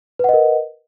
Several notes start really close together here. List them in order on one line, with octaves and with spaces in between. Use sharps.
B4 F#5 D#5 A#4